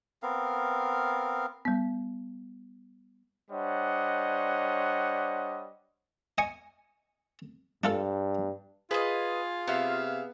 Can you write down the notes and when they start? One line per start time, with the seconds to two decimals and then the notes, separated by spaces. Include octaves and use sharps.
0.23 B3 C4 A#4 F5
1.65 G3 B3
3.51 G3 D4 C5 C#5 D#5 F#5
6.38 D#5 G#5 C#6
7.84 G2 D4 F4 A4
8.91 F4 G#4 B4 D#5
9.68 C3 B3 E5 F5